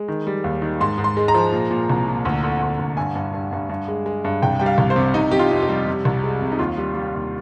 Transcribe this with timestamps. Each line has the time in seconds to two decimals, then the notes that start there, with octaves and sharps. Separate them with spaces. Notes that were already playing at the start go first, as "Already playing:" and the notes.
Already playing: G#3
0.08 D#3
0.27 G3
0.44 D#2
0.62 D#3
0.80 G#2 C6
0.98 G#2
1.04 C6
1.17 G#3
1.28 A#5
1.35 F3
1.52 A#2
1.71 A#2
1.90 C2
2.08 A#2
2.25 D2
2.43 D3
2.62 D2
2.79 D2
2.97 G2 G#5
3.15 G2
3.34 G2
3.52 G2
3.69 G2
3.88 G#3
4.06 G#3
4.25 G2
4.42 C2 G5
4.60 G3 G5
4.66 F5
4.78 C2
4.90 C5
4.96 C3
5.14 C3 D#4
5.31 C3 G4
5.39 F4
5.51 F2
5.63 G4
5.69 G3
5.87 C3
6.05 C2
6.24 G#3
6.41 C3
6.52 D#4
6.59 D#2 F4
6.78 G3
6.95 G3
7.14 D#2